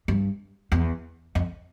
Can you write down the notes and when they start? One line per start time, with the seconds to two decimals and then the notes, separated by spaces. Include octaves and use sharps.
0.08 G2
0.72 E2
1.35 F2